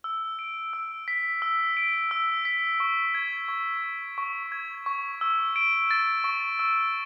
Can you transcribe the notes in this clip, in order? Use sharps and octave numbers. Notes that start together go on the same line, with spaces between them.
E6
D7
E6
B6
E6
D7
E6
B6
C#6
G#6
C#6
E6
C#6
G#6
C#6
E6
D7
A6
C#6
E6